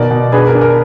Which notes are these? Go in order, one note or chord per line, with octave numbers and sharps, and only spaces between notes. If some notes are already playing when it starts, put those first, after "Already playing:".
Already playing: B2 D#3 A#4 D5
B2
D4 G#4 B4
A#4
D4
A#4